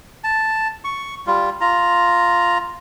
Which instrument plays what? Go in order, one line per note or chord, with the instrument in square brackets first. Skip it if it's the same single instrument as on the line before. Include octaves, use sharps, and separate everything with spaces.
[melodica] A5
C#6
G3 F4
F4 A#5